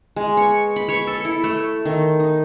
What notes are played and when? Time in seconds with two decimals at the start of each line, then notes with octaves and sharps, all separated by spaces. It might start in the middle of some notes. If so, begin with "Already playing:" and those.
0.16 G#3
0.37 C#5
0.76 B5
0.89 C#5
1.07 A4
1.25 E4
1.44 A3
1.85 D#3
2.20 D#4